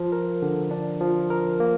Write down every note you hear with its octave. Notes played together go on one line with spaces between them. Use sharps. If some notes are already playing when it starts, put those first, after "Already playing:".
Already playing: F3
A#4
D3
D4
F3
A#4
A#3